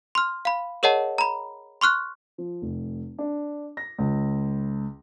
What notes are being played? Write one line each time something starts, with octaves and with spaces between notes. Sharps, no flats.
C6 F6
F5 B5
G#4 A#4 C#5 D#5 F#5 A5
A#5 B5
C6 C#6 F6 F#6
F3
F1
D4
A#6
C#2